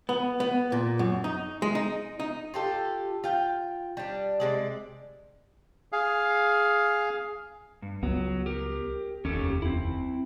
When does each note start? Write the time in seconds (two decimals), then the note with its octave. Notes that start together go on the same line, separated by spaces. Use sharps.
0.09 B3
0.40 B3
0.72 A#2
0.99 F#2
1.24 D#4
1.62 G#3
1.75 D#4
2.20 D#4
2.54 F4 G4 A4
3.24 F4 G5
3.97 G3 D4
4.40 C3 G#3 D5
5.92 G#4 F5
7.82 G2
8.03 C#2 F#3 B3
8.46 G4 A#4
9.25 F1 D#2 C#4 G4 A4
9.62 C4 E4